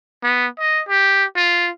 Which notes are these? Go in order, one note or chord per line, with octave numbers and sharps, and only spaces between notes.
B3
D#5
G4
F4